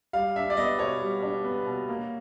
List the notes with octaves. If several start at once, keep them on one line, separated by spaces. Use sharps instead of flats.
G3 F5
D4 E5
D5
B3 D#5
B2 C#5
G3
D4
B3
B2
A#3